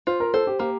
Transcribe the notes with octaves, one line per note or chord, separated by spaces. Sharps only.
F4 C5
A#4
A4 C5
G4
A#3 G4